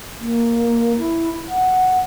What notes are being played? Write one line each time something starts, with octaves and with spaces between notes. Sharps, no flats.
A#3
E4
F#5